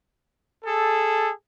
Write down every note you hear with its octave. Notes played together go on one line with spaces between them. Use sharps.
G#4 A4